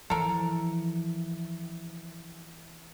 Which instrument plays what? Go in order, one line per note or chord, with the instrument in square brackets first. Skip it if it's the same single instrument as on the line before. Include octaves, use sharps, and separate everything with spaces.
[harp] E3 [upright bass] F3 [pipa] A4 A#4